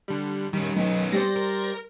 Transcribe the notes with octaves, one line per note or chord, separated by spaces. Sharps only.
D3 G3
D#3 G3 C#4
B1 B3 C#4
G3 C5 D5 A#6
A#4